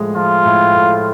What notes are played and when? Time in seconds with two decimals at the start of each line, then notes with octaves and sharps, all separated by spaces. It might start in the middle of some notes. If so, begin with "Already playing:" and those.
Already playing: A2 F3 G#3
0.16 F3 F4
0.45 A2
0.75 A2